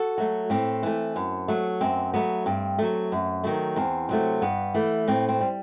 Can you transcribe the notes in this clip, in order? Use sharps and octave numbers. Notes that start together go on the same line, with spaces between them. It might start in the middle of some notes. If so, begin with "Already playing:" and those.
Already playing: F#4 A4
F#3 A3
A2 C4
E3 A3
F#2
F#3 A3
F#2 C4
F#3 A3 B3
G2 C4
F#3 A3
F#2
D#3 F#3 A3
E2 C4
C3 F#3 A3
G2 B3
E3 A3
A2 C4
C4
G3